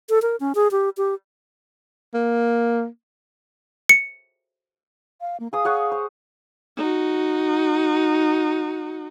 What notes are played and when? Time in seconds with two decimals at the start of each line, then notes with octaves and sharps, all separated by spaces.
0.10 A4
0.22 A#4
0.40 C#4
0.55 G#4
0.71 G4
0.97 G4
2.14 A#3
3.89 C#7
5.21 F5
5.40 A#3
5.53 G#4 F5 D#6
5.65 G#4 C#5 F#5
5.92 C5
6.77 D#4 F#4